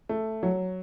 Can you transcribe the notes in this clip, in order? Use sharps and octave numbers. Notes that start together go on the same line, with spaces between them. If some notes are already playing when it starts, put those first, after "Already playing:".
A3
F#3